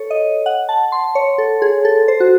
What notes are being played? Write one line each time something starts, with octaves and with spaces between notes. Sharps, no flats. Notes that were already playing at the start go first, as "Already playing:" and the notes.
Already playing: A4 C#5
D#5
F#5
A5
C6
C#5
A4
G#4
A4
C5
F#4